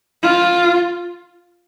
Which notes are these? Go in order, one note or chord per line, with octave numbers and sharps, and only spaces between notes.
F4